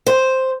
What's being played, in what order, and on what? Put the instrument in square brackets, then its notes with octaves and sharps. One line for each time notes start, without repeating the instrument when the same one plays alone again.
[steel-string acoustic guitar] C5